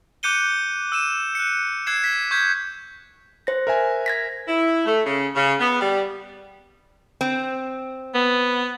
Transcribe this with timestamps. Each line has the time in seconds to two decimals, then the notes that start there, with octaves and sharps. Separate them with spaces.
0.23 D6 F#6 G6 C#7 D#7 G7
0.92 E6 D#7 E7
1.35 F#6 C#7
1.86 E6 F#6 G#6 C7 E7
2.04 B6
2.31 C#6 G6 G#6 B6
3.47 C5 A#6
3.67 A#4 E5 G#5
4.06 G#6 A#6 B6
4.48 E4
4.86 A3
5.06 C#3
5.35 C#3
5.59 B3
5.80 G3
7.21 C4
8.15 B3